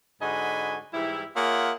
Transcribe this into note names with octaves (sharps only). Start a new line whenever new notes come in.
G#2 D3 F#4 D#5 G#5 B5
G#2 E3 G3 E4
A#3 F4 G#4 C#5 E5 F#5